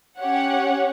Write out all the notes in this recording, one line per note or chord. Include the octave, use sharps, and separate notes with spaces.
C#4 G4 C#5 F#5